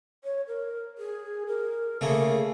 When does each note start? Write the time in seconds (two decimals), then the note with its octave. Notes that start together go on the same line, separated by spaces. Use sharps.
0.24 C#5
0.48 A#4
0.98 G#4
1.47 A#4
2.01 C#3 A3 A#3 G#4